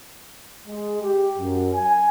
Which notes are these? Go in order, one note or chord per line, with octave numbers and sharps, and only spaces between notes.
G#3
G4
F#2
G#5